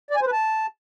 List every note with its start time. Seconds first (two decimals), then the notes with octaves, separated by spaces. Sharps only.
0.11 D5
0.16 G#5
0.21 C5
0.27 B4
0.32 A5